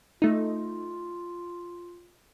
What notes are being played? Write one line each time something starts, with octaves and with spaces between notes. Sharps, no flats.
A3 D#4 F4